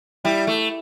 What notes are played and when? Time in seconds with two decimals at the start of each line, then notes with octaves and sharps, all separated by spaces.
0.24 G3 E4
0.47 A3